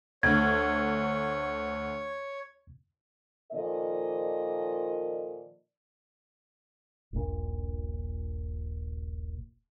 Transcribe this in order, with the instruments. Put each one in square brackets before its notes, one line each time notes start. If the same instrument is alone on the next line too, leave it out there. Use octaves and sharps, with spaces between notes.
[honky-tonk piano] D2 [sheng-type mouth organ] C#5 [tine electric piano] G#6
[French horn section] A#2 D#3 F3 A4 D5 D#5
[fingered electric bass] D#1 A#1 G2 A#2